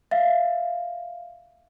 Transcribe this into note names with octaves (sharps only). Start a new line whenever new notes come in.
E5 F5